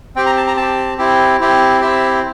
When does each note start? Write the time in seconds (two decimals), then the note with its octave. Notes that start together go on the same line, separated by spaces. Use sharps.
0.16 C4 G4 G5
0.26 A#5
0.37 A5
0.47 A#5
0.57 C4 A5
0.62 G4
0.98 C4 E4 G4
1.40 C4 E4 G4
1.81 C4 E4 G4 E5